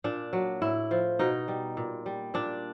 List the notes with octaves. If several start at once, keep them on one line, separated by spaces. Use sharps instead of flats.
A#2 D4
F#3
A2 E4
F3
B2 D#4
G3
A#2
G3
A#2 D4